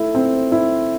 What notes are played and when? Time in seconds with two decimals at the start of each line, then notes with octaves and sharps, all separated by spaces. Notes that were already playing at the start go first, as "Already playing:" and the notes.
Already playing: A3 E4
0.15 C4
0.52 E4